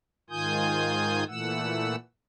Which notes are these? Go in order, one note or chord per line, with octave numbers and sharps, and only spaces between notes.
G#2 D#3 F4 G#5 D#6 G6
A#2 E3 A3 F#5 E6